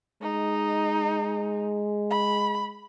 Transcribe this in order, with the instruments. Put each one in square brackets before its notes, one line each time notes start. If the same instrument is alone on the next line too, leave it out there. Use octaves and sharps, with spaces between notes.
[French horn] G#3 [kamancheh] D#4
[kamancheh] B5